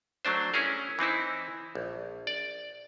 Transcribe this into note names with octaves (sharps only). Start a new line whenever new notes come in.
F#3 A3 D4 C5
C#4 E4 G#4 A#4
E3 C4 D#4 E4
A#1
D5